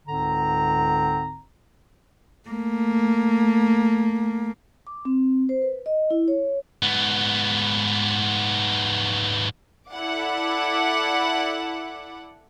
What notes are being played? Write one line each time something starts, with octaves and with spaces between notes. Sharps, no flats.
C#2 G#2 D3 C4 A#5
A3 A#3
D6
C4
C5
B4
D#5
E4
C#5
G#2 B3
E4 A4 D5 F#5 D6